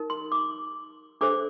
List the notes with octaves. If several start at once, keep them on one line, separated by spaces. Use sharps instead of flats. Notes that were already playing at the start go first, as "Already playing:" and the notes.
Already playing: D#4 A#4
C6
D6
D4 A4 C5 D6